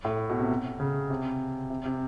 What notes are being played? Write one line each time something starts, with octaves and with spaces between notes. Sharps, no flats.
A2
B2
C3
C#3
C3
C3
C3